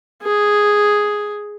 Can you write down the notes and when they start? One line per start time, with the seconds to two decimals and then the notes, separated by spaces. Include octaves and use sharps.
0.22 G#4